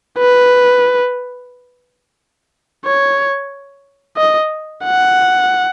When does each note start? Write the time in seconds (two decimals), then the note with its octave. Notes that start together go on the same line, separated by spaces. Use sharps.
0.19 B4
2.85 C#5
4.17 D#5
4.85 F#5